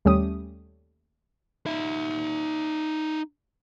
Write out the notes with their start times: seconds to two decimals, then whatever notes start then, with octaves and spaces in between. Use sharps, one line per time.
0.05 D#2 G3 A3 C#4 G4 D#6
1.66 D#4 E5